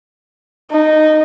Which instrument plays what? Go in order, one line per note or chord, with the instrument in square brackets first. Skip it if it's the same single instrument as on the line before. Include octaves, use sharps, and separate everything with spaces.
[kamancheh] D#4